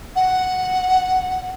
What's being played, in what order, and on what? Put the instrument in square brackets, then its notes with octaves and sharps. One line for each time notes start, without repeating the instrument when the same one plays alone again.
[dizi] F#5